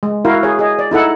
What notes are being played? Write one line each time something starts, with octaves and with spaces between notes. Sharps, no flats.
G#3
E4 F#4 A#4 F5
G#4 C#5
G#4 D#5
D5
D#4 E4 A4 F#5